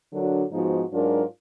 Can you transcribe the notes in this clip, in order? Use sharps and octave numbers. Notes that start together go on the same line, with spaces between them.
D3 F#3 D4 F#4 A#4
G#2 F3 B3 D#4 F#4
G#2 F#3 D4 F4 A#4